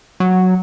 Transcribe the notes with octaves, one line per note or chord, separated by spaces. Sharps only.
F#3